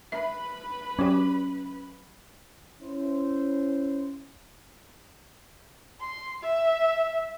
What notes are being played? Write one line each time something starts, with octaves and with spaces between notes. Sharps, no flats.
B4 E5 B5
F#3 C#4 F#4 G4
C#4 E4 C5
C6
E5